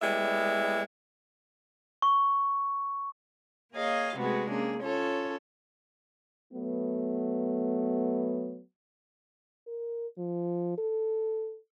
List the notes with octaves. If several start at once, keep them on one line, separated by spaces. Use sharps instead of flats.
A2 G3 G#3 B3 D5 E5
C#6
A#3 G#4 C#5 D#5 F5
C3 G#3 A3 B3 F#4 G#4
A#3 C#4 D4 G#4
C#4 F4 A4 C#5
F#3 A3 B3
A#4
F3
A4